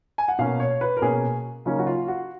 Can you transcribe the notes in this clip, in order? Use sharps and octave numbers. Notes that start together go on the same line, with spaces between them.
G#5
F#5
B2 A#3 C#4 F5
C#5
B4
A#4
B2 A#3 C#4 G#4
C#3 F#3 A#3 C#4 D#4
F#4
F4
F#4